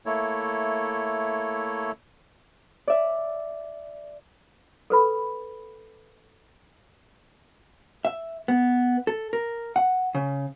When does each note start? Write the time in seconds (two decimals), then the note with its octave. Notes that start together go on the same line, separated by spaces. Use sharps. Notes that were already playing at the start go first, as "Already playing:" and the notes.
0.06 A3 A#3 E4 A4 C#5
2.88 D5 E5
4.90 A4 B4 B5
8.05 E5
8.48 B3
9.07 A4
9.33 A#4
9.76 F#5
10.15 C#3